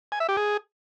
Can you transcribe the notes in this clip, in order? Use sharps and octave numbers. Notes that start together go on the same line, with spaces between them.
G#5
E5
G4
G#4